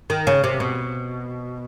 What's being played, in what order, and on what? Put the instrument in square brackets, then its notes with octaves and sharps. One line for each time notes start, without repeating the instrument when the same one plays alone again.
[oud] D#3
C#3
C3
B2